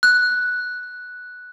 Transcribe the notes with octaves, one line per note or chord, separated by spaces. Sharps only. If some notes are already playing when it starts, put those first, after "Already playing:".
F#6